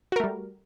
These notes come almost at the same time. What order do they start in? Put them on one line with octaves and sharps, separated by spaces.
F#4 A#4 A3 G3